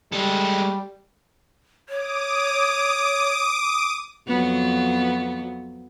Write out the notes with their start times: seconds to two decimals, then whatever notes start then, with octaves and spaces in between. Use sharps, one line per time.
0.13 G3 G#3 A4
1.89 C#5 D6 D#6
4.28 F2 F#3 B3